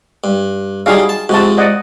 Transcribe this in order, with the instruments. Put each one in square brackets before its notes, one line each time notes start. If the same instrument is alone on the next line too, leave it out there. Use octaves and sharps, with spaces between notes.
[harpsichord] G2
[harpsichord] F#3 G3 [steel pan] D#4 G#4 F5
[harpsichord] A5
[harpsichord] G#2 C3 F3 [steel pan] F#4 A5
[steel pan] D5 D#5 F#5